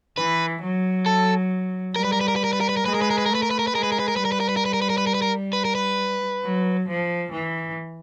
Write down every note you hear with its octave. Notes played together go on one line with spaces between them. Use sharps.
E3 B4
F#3
A4
G3 A#4
B4
A#4
B4
A#4
B4
A#4
B4
A#4
B4
A#4
G#3 B4
A#4
B4
A#4
B4
A#4
A3
B4
A#4
B4
A#4
B4
G#3 A#4
B4
A#4
B4
A#4
G3 B4
A#4
B4
A#4
B4
A#4
B4
A#4
B4
A#4
B4
A#4
B4
A#4
B4
A#4
B4
F#3
F3
E3